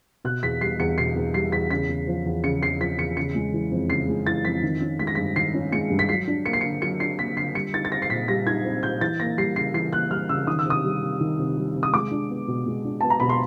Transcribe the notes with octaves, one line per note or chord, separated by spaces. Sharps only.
B2 F#6
E2 B6
G3 C7
E2 C#7
B2 C7
E2
G3 C7
E2 B6
C#3 B6
E2
F3
E2
C#3 C#7
E2 C7
F3 B6
E2 C#7
C#3 C#7
G#3
E3
F2
C#3 C7
G#3
E3 A6
F2 B6
D#3
C#4
G#3 B6
A#6
G2 B6
D#3 C7
C#4
G#3 C#7
G2
B6
F#3 C7
D4
A#3 C#7
C7
D3 C#7
F#3 C#7
D4 C7
A#3 B6
D3 C7
G3 C#7
D#4 A6
A6
C4 A#6
C7
A#2 B6
G3 A#6
D#4 G#6
C4
A#2 G6
E3 A6
A#3 A#6
G3 C7
C#3 C7
E3 C7
A#3 F#6
G3 F6
C#3 E6
D#3 D#6
E6
C3 D#6
G3
C3
D#3
C3
G3
C3
D#6
G#3 D6
D4
B3
B2
G#3
D4
B3 A5
A#5
B2 B5
C6